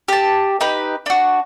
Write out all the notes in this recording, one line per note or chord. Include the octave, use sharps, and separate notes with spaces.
G4 A5
D#4 G4 B4
D4 F#4